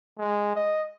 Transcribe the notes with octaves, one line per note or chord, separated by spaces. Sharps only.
G#3
D#5